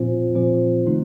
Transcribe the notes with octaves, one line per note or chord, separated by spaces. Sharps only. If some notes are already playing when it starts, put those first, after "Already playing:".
Already playing: A#2 F3 C4 F4 C5
A#2 F3 C4 F4 C5
C3 D#3 A3 D#4